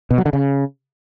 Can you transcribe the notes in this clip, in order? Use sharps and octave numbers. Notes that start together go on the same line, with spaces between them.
B2
F#3
D3
C#3